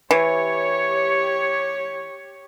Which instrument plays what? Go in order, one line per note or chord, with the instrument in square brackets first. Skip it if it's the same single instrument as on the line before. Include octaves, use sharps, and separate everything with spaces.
[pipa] E3 [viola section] G4 C#5